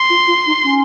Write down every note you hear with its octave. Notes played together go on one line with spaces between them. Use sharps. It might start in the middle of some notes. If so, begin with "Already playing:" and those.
Already playing: C6
F4
F4
D#4
C#4